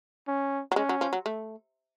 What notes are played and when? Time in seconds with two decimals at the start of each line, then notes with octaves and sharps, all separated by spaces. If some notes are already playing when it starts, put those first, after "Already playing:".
0.28 C#4
0.72 F#3
0.76 G#3 C#4
0.89 F#3
1.01 F3
1.13 F#3
1.26 A3